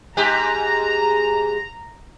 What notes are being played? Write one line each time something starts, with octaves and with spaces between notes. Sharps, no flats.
G#2 G4 G#4 A#5